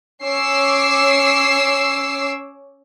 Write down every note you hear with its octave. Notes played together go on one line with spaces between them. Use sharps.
C#4 C#5 D6 E6 C7